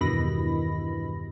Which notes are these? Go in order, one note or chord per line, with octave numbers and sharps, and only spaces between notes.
E2 G2 B2 D#3 B5 A#6